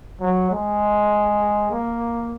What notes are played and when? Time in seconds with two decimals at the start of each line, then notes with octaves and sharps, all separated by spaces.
0.20 F#3
0.51 G#3
1.70 A#3